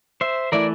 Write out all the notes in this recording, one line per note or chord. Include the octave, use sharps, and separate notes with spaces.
C5 E5
E3 A3 E4 A#4 D5